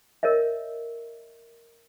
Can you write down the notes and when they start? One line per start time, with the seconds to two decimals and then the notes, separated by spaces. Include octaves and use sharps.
0.23 A#4 C#5 D#5 E5